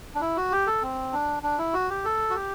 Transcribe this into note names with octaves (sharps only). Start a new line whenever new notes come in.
D4
E4
F#4
G4
A4
C4
D4
D4
E4
F#4
G4
A4
F#4
G4